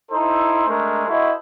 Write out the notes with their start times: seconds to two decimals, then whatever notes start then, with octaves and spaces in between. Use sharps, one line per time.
0.12 D#4 E4 A4 C5
0.68 G#3 A3 D4 A#4
1.07 E4 F#4 A4 C5 D#5